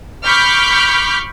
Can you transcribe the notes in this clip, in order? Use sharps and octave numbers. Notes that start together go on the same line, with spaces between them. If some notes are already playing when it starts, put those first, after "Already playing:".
B5 C#6 D6 F6 G6 B6